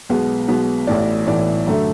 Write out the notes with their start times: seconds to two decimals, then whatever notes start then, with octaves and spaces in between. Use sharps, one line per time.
0.09 B1 B2 G#3 B3
0.48 B1 B2 G#3 B3
0.87 A1 A2 E3 D5
1.27 A1 A2 E3 D5
1.67 F#2 D3 A3